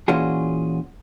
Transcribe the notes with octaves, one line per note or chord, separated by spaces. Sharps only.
A#2 E3 C#4 F4 F#4 G#4